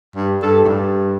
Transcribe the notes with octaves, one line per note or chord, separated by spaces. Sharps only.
G2
G2 A4
A2
G2